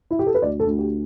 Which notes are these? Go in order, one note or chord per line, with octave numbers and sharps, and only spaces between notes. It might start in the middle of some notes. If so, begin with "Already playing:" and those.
E4
G4
A4
B4
D2 D5
A4
D2
G4